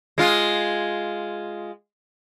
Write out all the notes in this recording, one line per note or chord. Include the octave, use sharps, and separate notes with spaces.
G#3 F4